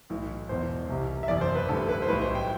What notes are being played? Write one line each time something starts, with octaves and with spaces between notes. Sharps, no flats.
B1 A2 E3
E1 E2 B2 C5
C2 C3 G3
E5
F#1 E2 C3 D5
C5
B4
D2 D3 G3 A4
B4
C5
B1 A2 G3 B4
C5
G5